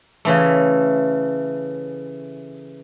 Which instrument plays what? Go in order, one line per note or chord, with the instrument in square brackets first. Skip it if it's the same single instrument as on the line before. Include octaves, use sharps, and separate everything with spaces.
[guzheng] C#3 E3 A3